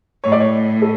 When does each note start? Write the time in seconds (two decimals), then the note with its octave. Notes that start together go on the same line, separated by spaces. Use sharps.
0.24 A2 C#5
0.32 D5
0.40 C#5
0.82 A4